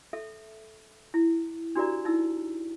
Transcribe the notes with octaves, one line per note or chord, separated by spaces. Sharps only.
A4 E5
E4
D4 F#4 G4 A#4 D5 A#5
D#4 E4 E6